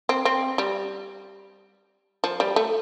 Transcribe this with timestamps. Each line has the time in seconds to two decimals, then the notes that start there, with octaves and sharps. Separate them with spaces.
0.09 C4
0.25 C4
0.58 G3
2.24 F3
2.40 G3
2.56 A3